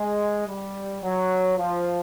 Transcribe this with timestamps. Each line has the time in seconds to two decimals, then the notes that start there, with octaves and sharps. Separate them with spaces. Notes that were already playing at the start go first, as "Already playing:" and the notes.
Already playing: G#3
0.47 G3
1.02 F#3
1.57 F3